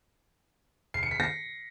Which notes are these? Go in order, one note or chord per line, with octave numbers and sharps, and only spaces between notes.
C7
C#7
B6
A#6